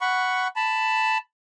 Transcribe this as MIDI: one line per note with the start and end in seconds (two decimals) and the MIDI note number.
0.01 0.48 78
0.01 0.48 83
0.01 0.48 85
0.56 1.18 81
0.56 1.18 83